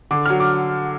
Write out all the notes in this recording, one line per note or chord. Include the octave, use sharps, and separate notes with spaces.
D3 D6
F#3 F6
D6